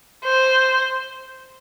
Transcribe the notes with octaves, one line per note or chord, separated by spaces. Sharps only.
C5